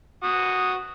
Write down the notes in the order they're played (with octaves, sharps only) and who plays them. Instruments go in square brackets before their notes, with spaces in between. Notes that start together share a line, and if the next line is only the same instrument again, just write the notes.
[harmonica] F#4 D#6